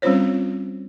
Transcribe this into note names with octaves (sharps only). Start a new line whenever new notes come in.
G3 C4 C#4 F4 C5 C#5